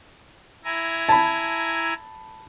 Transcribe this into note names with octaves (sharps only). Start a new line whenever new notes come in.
E4 G#5 A#5
A5 B5